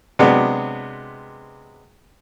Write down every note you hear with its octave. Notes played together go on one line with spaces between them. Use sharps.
C3 F#3 G#3 B3 D4